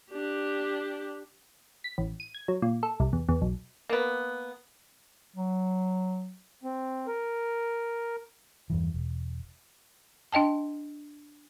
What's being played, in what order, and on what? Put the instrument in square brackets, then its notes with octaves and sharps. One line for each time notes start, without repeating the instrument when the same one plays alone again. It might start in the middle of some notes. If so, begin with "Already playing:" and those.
[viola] D4 G4
[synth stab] B6
A1
D#7
G#6
F#3
A#2
A4
C2
E2
E2
B1
[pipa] A#3 B3
[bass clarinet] F#3
[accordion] C4
A#4
[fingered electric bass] E2 G2 E3
E1
[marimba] D4 D#5 G5 A5